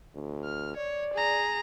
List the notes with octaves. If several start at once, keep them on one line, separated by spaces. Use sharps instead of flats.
D2
F6
C#5 D5
G#4 A#5